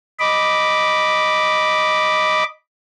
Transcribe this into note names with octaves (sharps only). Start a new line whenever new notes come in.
D#5 B5 D6